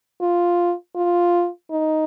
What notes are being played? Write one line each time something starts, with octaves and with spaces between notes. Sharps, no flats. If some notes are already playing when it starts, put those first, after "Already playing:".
F4
F4
D#4